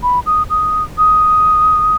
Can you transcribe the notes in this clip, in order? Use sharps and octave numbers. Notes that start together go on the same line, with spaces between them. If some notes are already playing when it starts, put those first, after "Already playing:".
B5
D#6
D#6
D#6